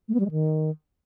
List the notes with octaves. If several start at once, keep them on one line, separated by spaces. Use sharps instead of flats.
A3
B3
G3
G#3
D#3